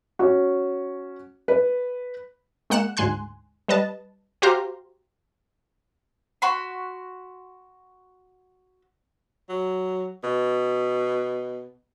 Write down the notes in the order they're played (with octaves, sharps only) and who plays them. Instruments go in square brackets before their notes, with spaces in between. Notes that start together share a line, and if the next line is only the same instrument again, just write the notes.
[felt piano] C#4 F#4
B4
[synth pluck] G#3 A#3 F#5 F#6 C#7 E7
D2 G#2 G#5 C6 F#6
G3 B4 D#5 A5
F#4 G4 C5 F5 A#5 C6
[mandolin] F#4 B5 C6
[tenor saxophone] F#3
B2